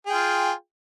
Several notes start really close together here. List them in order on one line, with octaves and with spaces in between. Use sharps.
G#4 G5 F4